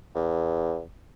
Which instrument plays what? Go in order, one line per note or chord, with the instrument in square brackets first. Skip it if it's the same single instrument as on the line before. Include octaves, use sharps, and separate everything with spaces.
[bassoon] E2